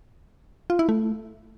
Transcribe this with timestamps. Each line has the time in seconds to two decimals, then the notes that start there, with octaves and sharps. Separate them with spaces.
0.70 F4
0.79 E4
0.89 A3